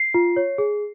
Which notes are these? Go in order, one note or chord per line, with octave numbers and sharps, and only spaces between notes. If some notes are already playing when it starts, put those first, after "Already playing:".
Already playing: C7
F4
C#5
G#4